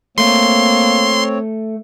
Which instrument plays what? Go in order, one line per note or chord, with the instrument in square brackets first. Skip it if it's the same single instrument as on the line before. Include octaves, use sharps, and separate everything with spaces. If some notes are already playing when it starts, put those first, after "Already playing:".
[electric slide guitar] A3 [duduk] A#3 [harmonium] C4 C#5 [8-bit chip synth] C6